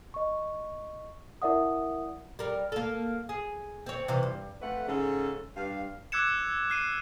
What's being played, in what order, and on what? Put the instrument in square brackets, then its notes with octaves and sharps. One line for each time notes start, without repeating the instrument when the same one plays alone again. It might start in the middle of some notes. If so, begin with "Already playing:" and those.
[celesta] D#5 C#6
E4 A#4 D5 E5 F#5 D#6
[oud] G3 A#4
A#3 A4
G#4
C4 C#5
C3 E3
G2
[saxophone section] F2 A3 B4 F#5
G#2 C#3 C#4 A4
G2 F5
[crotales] D6 E6 F#6 G#6 C#7 E7
F6 C7 D#7